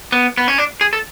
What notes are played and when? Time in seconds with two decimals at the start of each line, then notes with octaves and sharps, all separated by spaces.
0.12 B3
0.37 B3
0.48 C#4
0.58 D4
0.81 G#4
0.93 A4